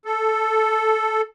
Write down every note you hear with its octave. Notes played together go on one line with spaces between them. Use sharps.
A4